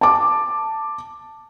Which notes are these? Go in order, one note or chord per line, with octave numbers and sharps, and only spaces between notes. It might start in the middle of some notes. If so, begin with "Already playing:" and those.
A5 D6